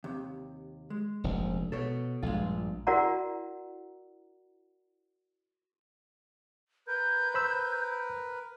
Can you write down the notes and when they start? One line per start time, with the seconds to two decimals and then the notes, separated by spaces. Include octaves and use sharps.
0.04 D#2 C3
0.90 G#3
1.24 F1 A#1
1.72 B2 A4 C#5
2.23 A#1 G2 G#3 F4
2.87 E4 F#4 A#4 D5 F#5 A#5
6.87 A#4 B4 G6
7.34 C5 B5 E6